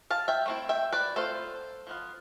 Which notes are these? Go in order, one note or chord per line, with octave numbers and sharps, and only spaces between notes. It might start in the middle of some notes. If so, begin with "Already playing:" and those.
F5 A5
E5 G5
A3 C4 E4
E5 G5
B4 D5
A3 C4 F4 A4 C5
F3 B3 F4